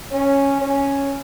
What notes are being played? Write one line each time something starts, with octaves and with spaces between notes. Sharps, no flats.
C#4
C#4